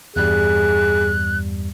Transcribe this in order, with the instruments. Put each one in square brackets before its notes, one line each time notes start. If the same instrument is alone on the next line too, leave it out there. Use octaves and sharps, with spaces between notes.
[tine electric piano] E2 G2 G3 [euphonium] G#4 [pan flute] F#6